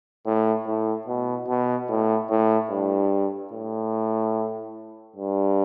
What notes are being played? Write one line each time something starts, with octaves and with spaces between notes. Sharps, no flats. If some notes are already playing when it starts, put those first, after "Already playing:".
A2
A2
B2
B2
A2
A2
G2
A2
G2